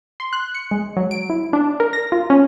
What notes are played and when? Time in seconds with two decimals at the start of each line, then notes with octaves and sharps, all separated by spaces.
0.20 C6
0.33 F#6
0.55 C#7
0.71 G#3
0.97 F#3
1.11 D7
1.30 E4
1.53 D4
1.80 A#4
1.93 A#6
2.12 F4
2.30 C#4